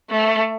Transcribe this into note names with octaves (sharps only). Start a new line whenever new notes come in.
A3